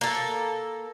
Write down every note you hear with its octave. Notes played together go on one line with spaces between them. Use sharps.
A#3 A4